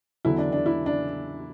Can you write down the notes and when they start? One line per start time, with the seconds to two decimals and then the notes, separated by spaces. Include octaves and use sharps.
0.25 E2 D3 F#3 E4
0.38 D4
0.52 D4
0.66 E4
0.86 D4